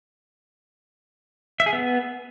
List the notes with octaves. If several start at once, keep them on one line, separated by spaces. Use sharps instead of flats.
E5
G#4
B3